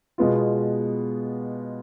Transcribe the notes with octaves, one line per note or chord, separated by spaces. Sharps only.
B2 G#3 B3 F4